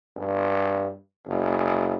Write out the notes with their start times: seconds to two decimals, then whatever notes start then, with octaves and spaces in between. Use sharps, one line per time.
0.16 G2
1.26 F#1